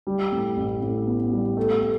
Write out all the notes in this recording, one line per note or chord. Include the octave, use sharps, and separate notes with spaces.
G3
A2
A1
A2
B3
G3
A3
A3